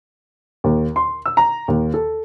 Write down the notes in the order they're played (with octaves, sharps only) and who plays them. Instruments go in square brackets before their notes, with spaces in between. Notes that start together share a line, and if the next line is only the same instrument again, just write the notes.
[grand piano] D#2
C6
E6
A#5
D#2
A4